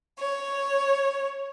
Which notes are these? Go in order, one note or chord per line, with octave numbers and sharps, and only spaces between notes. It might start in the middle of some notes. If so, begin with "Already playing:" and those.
C#5